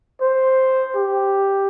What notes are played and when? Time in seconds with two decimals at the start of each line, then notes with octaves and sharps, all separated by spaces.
0.21 C5
0.96 G4